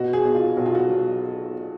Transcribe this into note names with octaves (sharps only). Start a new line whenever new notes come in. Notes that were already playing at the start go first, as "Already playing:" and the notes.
Already playing: B2 F#4
G#4
B1
F4
B1 F#4
F4
F#4
F#3